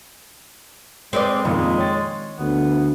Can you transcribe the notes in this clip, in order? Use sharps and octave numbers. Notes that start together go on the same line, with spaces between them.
G#3 C4 B4 D5
F2 A#2 D#3 G#3 A#3
C#5 C6 A6
D2 B3